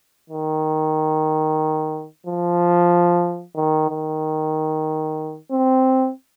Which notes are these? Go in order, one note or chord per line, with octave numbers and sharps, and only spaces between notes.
D#3
F3
D#3
D#3
C4